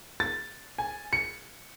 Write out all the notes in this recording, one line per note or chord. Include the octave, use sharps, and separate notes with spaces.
A6
G#5
C#7